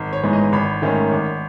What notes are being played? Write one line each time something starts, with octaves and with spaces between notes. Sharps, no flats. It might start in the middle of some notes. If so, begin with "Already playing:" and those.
Already playing: G#1
C#5
G#2 E3 G#3 B3
D#5
G#1 B5
G#2 D#3 A3 C#4
G#1